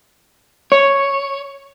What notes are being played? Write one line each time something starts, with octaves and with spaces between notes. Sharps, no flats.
C#5